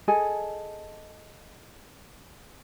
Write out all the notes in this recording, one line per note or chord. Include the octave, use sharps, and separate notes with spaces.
G#4 A4 D#5 G#5